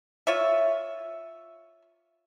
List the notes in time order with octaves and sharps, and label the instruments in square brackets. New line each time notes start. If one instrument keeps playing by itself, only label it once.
[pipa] F4 C#5 E5